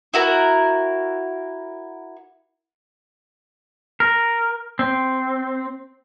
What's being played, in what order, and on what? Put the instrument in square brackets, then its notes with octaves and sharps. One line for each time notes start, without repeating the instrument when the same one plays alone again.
[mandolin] E4 F#4 A#4
[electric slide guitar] A#4
C4